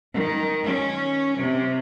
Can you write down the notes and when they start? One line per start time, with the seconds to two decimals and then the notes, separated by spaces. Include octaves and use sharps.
0.12 D#3
0.67 C#4
1.40 C3